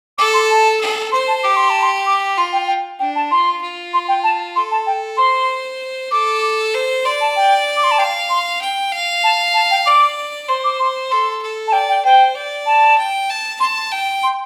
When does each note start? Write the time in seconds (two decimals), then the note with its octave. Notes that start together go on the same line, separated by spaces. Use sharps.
0.18 A4 D6
0.34 C6
0.50 A5
0.81 A4
1.12 C5 C6
1.28 A5
1.44 G4 D6
1.57 C6
1.70 A5
1.82 C6
2.07 D6
2.38 F4 C6
2.53 G5
2.68 G5
2.99 D4 G5
3.16 A5
3.31 F4 C6
3.62 F4
3.94 C6
4.08 G5
4.24 A5
4.56 A4 C6
4.71 A5
4.87 G5
5.17 C5 C6
6.11 A4 D6
6.74 C5
7.05 D5 C6
7.21 A5
7.36 G5
7.77 D6
7.84 C6
7.91 A5
7.98 F5 G5
8.30 C6
8.61 G5
8.92 F5
9.24 A5
9.54 A5
9.71 G5
9.86 D5 D6
10.48 C5 C6
10.64 D6
10.79 C6
11.11 A4 C6
11.42 A4
11.68 A5
11.73 D5 G5
11.89 G5
12.05 C5 G5
12.35 D5
12.66 A5
12.98 G5
13.29 A5
13.60 A5 C6
13.91 G5
14.23 C6